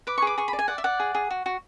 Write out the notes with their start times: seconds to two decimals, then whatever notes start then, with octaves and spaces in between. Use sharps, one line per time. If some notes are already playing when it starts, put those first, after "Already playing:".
0.07 B4 D6
0.18 C#6
0.22 G#4 D6
0.38 G#4 C#6
0.48 B5
0.53 D5
0.59 G#5
0.68 D5 F#5
0.78 E5
0.84 D5 F#5
1.00 G#4
1.15 G#4
1.31 F#4
1.46 F#4